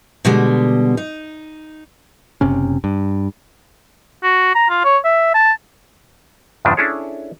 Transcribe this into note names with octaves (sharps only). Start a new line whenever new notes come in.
B2 D3 G3 G#3
D#4
F#1 C3 C#4
G2
F#4
A#5
F4
C#5
E5
A5
E2 G2 C#3 F3 D4
C#4 D4 E4 G#4 A4 C#5